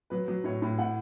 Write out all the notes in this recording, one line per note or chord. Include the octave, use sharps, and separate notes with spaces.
F#3 B4
F#3
A2 C#5
A2
A2 F#5